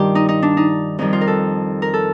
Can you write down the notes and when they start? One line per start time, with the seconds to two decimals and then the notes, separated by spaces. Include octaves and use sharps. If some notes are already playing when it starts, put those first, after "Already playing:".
Already playing: G2 D#3 G3 F4 G4
0.15 D#4
0.29 D#4
0.42 D4
0.57 D#4
0.99 F2 D#3 G3 D#4
1.13 F4
1.21 A#4
1.27 A4
1.82 A#4
1.94 A4